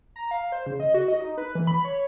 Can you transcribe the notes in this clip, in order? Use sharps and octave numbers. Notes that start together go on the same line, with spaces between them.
A#5
F5
C5
C#3
D#5
F#4
D#5
D#4
B4
E3
B5
C#5